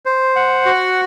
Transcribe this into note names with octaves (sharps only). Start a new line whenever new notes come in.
C5
F#5
F#4